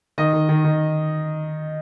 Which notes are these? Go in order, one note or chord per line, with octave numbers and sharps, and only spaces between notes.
D#3 D#5
D#3
D#3
D#3